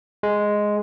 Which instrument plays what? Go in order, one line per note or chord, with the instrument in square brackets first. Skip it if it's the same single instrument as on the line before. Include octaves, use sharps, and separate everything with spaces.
[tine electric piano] G#3